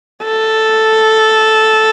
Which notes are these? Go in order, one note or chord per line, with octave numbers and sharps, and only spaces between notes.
A4